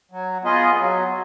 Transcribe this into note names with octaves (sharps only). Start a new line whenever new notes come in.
F#3
B3 F4 G#4 D#5
F#3